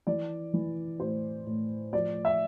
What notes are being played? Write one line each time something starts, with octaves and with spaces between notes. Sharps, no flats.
E3 D5
E3
A2 C5
A2
F3 D5
E5